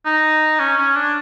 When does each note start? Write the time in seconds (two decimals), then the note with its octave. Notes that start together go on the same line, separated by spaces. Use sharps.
0.06 D#4
0.60 C#4
0.78 C#4
0.95 D4